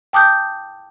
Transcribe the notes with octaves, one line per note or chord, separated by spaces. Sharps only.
G5 A5 D6 D#6 F#6 G6